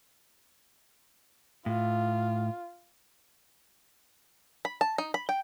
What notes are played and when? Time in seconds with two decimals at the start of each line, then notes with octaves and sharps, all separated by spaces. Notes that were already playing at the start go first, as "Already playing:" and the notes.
1.66 A2 F4
4.65 B5
4.81 A5
4.98 D#4
5.14 B5
5.29 G5